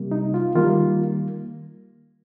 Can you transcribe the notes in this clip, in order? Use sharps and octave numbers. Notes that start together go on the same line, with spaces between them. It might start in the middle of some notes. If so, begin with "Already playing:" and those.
Already playing: C3 G3 A#3
D#4
F4
D#3 G3 A#3 F4